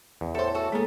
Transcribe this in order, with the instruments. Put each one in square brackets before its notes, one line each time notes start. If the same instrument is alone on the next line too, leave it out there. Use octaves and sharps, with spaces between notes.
[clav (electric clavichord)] E2
[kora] A2 G4 [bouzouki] A4 C5 [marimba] E5
[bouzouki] F#4 A4
[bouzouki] C#3 B3 [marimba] G#3 A#3 A4